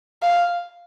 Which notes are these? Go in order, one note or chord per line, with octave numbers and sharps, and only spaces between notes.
F5